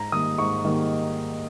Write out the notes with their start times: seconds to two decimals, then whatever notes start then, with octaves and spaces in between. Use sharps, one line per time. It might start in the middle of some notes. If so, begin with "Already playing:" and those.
Already playing: G#2 A#5
0.12 D#3 G3 A#3 D#6
0.38 G#2 C#6
0.65 D#3 G3 A#3